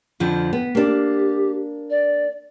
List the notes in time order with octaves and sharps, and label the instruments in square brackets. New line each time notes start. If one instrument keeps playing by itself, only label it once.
[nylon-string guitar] F2 D3 F3
B3
[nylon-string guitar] A#3 D4 [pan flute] G4
[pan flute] D5